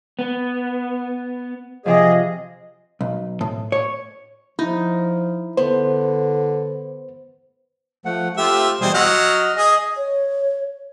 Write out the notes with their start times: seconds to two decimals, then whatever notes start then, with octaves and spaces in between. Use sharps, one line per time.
0.19 B3
1.86 C3 F3 G#4 D#5
3.01 B1
3.41 A2
3.72 C#5
4.59 F3 D#4 E4
5.57 D3 B3 C5
8.05 F3 A3 F#5
8.37 A3 C4 F4 G4 E5
8.81 B2 E3 G3 G#4 C5
8.94 F#3 D#5 F#5 E6 F6
9.56 G#4 D#5 D#6
9.97 C#5